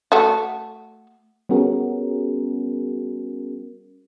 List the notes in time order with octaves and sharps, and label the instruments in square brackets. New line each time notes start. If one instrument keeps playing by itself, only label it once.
[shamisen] A3 F#4
[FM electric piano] G3 B3 C#4 F#4 G#4 A#4